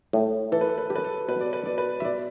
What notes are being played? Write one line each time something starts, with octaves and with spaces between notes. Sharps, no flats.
A2
E3 A4
B4
A4
B4
G4 A4
B4
A4
B2 B4
D5
B4
B2 D5
B4
E5
B2 D5